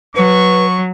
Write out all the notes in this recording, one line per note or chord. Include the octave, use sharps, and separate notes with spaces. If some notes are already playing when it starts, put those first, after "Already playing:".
F#3 B4 C#6